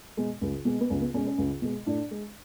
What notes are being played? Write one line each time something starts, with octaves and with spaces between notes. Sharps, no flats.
B2 G#3
C#2
B2 G#3
B3
C#2 C#4
B3
B2 G#3 C#4
C#4
C#2
B2 G#3
A2 D4
G#3